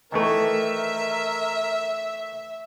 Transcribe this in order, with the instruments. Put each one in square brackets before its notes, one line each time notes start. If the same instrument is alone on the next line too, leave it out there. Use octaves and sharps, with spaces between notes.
[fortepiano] D#3 E3 A3 [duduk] A#4 [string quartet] E5